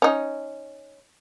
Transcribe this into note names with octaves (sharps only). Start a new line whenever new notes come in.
C#4 D#4